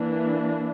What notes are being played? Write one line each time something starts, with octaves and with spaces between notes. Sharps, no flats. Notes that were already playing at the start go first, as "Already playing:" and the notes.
Already playing: E3 A#3 D4